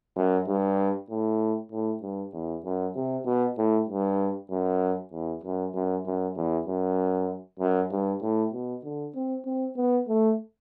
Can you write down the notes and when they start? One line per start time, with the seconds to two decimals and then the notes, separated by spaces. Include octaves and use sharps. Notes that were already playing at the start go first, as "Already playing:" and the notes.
0.16 F#2
0.48 G2
1.10 A2
1.72 A2
2.02 G2
2.33 E2
2.65 F#2
2.96 C3
3.26 B2
3.58 A2
3.89 G2
4.50 F#2
5.12 E2
5.44 F#2
5.74 F#2
6.06 F#2
6.37 E2
6.67 F#2
7.59 F#2
7.91 G2
8.22 A2
8.53 B2
8.84 D3
9.15 C4
9.46 C4
9.77 B3
10.08 A3